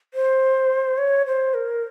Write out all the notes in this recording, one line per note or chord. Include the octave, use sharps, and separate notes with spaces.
C5
C#5
C5
A#4